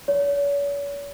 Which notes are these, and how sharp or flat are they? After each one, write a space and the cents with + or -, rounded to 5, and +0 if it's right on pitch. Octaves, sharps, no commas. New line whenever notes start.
C#5 +40